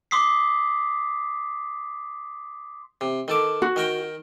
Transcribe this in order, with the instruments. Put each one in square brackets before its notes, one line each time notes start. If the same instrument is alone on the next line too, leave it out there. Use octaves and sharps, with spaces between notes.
[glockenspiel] C6 D6 D#6 B6 C7
[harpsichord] C3
D#3 A4 D6
[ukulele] F#4
[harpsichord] D#3 A#4 G5